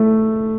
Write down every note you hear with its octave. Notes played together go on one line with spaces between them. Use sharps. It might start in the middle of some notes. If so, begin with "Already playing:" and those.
Already playing: A3